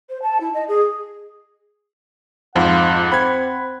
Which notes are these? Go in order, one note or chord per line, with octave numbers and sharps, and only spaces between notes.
C5
A5
E4
D#5
G#4
F2 G#2 F3 F4 F#5
C4 B5 G#6